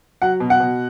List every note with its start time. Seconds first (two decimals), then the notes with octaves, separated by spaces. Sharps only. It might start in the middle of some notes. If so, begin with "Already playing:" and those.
0.22 F#3 F#5
0.40 B2
0.50 F#5
0.60 B2